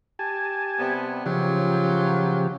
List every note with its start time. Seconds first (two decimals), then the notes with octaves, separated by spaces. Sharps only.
0.19 G4 G#5 A5
0.79 C3 G3 B3
1.26 C#3 F3 F#3 F4 G4